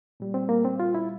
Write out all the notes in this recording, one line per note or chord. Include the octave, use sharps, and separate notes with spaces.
A#2 G3
C4
A#3
C4
F4
E4